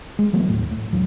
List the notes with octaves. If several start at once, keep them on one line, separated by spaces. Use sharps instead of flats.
G#3
E3 F#3 A3 B3
D#1 A2 A3
A2
E1 F#3